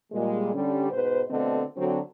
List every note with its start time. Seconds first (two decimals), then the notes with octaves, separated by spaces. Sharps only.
0.12 A#2 G3 G#3
0.54 D3 G3 C#4
0.91 G#2 B2 B4 C5
1.29 B2 D3 A3 C4 A4 D#5
1.77 D3 F#3 C4